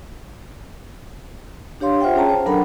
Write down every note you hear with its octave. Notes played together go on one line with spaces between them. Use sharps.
D4 G4 C#5 F5 C6
F4 C5 E5 F#5 G5
C#4 G#4 C#5 G5 A5 A#5
C5
F#3 D4 A4 A#4 F#5 B5